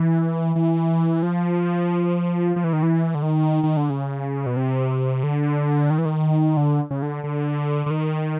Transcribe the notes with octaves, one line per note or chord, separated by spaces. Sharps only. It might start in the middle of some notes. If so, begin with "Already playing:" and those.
Already playing: E3
E3
F3
F3
E3
D#3
E3
D3
D#3
D#3
D3
C#3
B2
C3
D3
D#3
E3
D#3
D3
C#3
D3
D3
D3
D#3